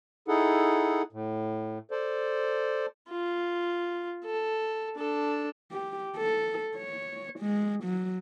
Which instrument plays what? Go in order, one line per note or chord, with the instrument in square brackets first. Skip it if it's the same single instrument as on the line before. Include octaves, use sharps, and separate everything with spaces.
[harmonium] D#4 E4 G#4 A4 F#5
A2
A4 C5 D5
[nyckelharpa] F4
A4
D4 A4
[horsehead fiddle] G4
A4
C#5
G#3
F#3